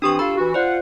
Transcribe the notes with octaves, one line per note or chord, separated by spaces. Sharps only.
E3 C4 D4 G4 C#6 D#6
F4 A4 B5
E3 F#4
F4 C5 D5 F#5